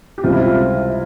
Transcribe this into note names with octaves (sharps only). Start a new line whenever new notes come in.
G4
C#2 C3 G3 C4 F4
E4
F4